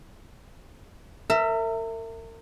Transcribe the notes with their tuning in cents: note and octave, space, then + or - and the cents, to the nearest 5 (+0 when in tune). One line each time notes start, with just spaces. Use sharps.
A#4 -40 E5 +0